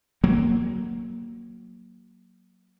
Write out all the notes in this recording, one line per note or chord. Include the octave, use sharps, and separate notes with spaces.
F#3 A#3